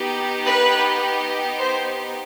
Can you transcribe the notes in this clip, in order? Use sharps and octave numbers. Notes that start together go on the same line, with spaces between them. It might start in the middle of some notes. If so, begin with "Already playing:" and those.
Already playing: B3 D#4 G4
B4
C5